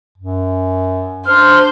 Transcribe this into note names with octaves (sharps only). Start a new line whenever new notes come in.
F#2
D4 C5 F6